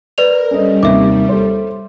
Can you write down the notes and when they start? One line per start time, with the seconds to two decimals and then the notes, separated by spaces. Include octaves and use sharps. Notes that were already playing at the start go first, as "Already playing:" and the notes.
0.18 A#4 B4 D5 F7
0.51 G3 C#4 A4 D#5
0.83 D#2 C3 E5 D6
1.29 A4 C5